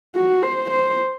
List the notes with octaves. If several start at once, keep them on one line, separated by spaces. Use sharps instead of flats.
F#4
C5
C5